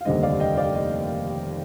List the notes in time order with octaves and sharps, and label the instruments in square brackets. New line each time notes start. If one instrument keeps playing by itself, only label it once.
[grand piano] F5
F1 D#2 D3 G3 C5 D#5
D5 F5
D#5 G5
D5 F5
D#5